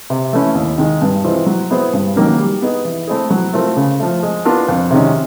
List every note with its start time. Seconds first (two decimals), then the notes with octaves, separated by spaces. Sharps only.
0.10 C3
0.33 E3 A3 C#4 E4
0.55 D#2
0.78 D#3 G#3
1.02 G2
1.25 E3 G#3 C4 F4
1.46 F#3
1.71 B3 E4 G#4 C5
1.93 G2
2.16 D#3 F#3 A#3 C#4
2.38 G3
2.62 B3 D#4 G#4
2.85 E3
3.07 A3 C4 E4 G#4
3.30 F#3
3.53 A3 C4 F4 A#4
3.77 C#3
4.00 F3 A3
4.23 G#3
4.45 B3 D4 F4 A#4
4.68 F2
4.91 C3 D#3 G#3 C#4